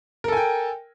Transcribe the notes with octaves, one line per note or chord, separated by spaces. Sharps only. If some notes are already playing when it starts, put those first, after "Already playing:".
A4 A#4 G5 G#5